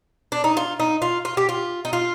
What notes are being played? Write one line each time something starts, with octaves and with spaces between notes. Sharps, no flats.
D4
D#4
F4
D#4
F4
F4
G4
F4
D#4
F4